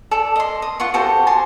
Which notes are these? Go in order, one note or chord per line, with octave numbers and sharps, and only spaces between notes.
A4 D5
D#5 C6
D#6
F4 F#5 C6 C#6
F#4 G4 A4 C5
F#4 G#5 A5 C6